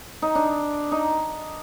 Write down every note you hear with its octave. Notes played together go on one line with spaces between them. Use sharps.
D#4
D4
D#4